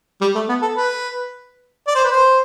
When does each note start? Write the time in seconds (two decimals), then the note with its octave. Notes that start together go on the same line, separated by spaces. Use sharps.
0.21 G3
0.35 A3
0.49 B3
0.62 A4
0.76 B4
1.87 D5
1.95 C5
2.04 B4
2.11 C5